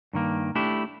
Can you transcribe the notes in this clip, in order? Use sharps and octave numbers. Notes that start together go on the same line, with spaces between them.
G2 D#3 A#3
A3 D4 E4 G4